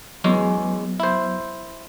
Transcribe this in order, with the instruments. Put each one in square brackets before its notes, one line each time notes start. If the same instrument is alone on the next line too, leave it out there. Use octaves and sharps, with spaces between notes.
[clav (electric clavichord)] E2 G#3 C#4 [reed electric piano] F#3 B3
[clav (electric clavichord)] E4 C5